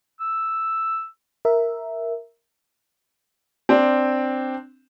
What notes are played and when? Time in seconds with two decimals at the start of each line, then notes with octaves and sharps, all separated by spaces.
0.20 E6
1.45 A#4 E5
3.69 C4 D4